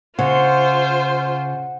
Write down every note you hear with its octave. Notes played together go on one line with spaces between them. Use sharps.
C#3 F4 C5 F#5